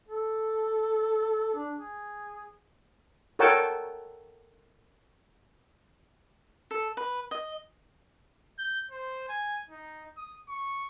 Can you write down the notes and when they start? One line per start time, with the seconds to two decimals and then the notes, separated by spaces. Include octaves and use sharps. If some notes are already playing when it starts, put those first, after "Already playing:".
0.08 A4
1.55 D4
1.76 G#4
3.39 A4 A#4 C#5 F#5 G5 A5
6.71 A4
6.97 B4
7.31 D#5
8.59 G6
8.91 C5
9.29 G#5
9.70 D#4
10.17 D#6
10.49 C#6